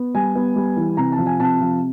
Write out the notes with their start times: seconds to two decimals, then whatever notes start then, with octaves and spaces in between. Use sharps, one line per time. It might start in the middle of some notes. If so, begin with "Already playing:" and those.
Already playing: B3
0.15 G3 G#5
0.35 B3
0.56 G3
0.76 E3
0.97 C3 A#5
1.12 A5
1.18 F3
1.26 G#5
1.40 C3 A5
1.61 F3